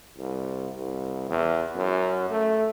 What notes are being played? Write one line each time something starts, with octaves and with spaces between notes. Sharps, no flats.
C2
C2
E2
F#2
A3